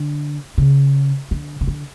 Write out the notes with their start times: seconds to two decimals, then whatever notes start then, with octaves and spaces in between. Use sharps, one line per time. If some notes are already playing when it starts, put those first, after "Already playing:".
Already playing: D3
0.58 C#3
1.31 D3
1.61 C#3
1.67 D3